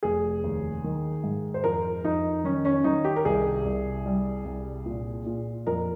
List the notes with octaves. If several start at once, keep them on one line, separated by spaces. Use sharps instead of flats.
F1 G#4
D#2
D#3
G#2
C5
F2 A#4
F2 D#4
D#3 C#4
C#4
D#3 D#4
G4
A#4
C2 G#4
C2
G3
C2
A#2
A#2
F2 A#4